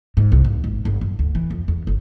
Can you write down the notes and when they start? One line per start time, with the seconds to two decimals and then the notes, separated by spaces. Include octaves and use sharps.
0.17 G#2
0.32 C2
0.45 D#2
0.64 G#1
0.85 G1
1.01 F#2
1.19 D2
1.35 E3
1.51 F2
1.68 E2
1.87 G1